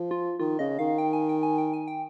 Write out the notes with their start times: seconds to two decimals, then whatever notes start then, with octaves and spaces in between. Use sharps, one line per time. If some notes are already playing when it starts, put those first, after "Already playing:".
Already playing: F3
0.11 F4
0.39 D#3 F4
0.59 C#3 D#5
0.79 D#3 F5
0.98 G5
1.13 G#5
1.29 G5
1.43 G#5
1.58 G5
1.73 G#5
1.88 G5